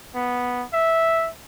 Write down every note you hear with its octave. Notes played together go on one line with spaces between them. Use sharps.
B3
E5